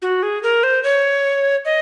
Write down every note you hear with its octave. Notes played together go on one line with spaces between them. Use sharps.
F#4
G#4
A#4
C5
C#5
D#5